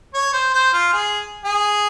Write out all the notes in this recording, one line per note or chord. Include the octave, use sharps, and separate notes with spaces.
C#5
C5
C5
F4
G#4
G#4